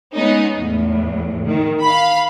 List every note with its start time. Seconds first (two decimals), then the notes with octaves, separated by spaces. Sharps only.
0.15 G#3 B3 C#4 D#4
0.57 E2 A2
1.47 D#3
1.82 F5 B5